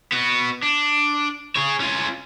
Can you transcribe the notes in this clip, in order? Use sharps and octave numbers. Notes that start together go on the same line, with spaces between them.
B3 F#4
D4
G#4 C#5
C#4 F4